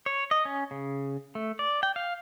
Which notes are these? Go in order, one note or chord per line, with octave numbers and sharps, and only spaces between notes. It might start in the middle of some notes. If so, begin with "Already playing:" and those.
C#5
D#5
C#4
C#3
A3
D5
G5
F5